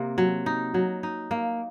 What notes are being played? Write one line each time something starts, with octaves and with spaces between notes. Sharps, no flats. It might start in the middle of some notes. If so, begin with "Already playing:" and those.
Already playing: C3 A#3
F#3
D#4
F#3
D#4
A#3